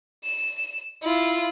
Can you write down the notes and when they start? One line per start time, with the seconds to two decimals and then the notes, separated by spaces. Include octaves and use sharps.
0.24 E7
1.02 E4 F4